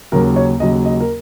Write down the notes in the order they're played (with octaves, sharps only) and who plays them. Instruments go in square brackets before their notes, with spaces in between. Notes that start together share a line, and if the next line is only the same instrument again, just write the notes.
[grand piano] D#2 C#3 F#3 A#4
C#5
D#2 C#3 F#3 D#5
D#5
A#4